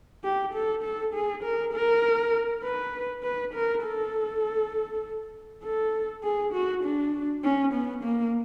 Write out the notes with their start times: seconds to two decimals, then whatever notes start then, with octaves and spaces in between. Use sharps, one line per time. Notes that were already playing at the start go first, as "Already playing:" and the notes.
0.24 G4
0.54 A4
0.83 A4
1.14 G#4
1.44 A#4
1.73 A#4
2.63 B4
3.23 B4
3.54 A#4
3.83 A4
5.63 A4
6.23 G#4
6.53 F#4
6.84 D4
7.44 C#4
7.73 B3
8.04 A#3